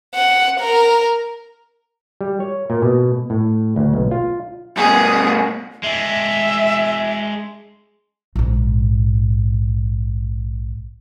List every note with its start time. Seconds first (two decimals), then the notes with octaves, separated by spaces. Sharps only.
0.15 F#5
0.60 A#4
2.21 G3
2.40 C#5
2.70 A#2
2.82 B2
3.30 A2
3.76 D2
3.94 B1
4.11 F4
4.77 G2 B2 G#4
5.83 G#3 D4 E5
8.36 A#1 G#2